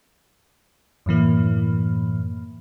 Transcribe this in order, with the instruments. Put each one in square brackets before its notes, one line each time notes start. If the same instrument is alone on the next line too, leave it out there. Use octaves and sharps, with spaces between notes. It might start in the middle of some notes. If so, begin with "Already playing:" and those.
[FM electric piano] F#2 A2 E3 A#3